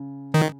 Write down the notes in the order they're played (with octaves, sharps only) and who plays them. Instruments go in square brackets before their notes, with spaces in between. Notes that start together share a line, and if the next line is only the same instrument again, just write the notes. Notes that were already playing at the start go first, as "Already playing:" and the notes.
Already playing: [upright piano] C#3
[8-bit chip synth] D#3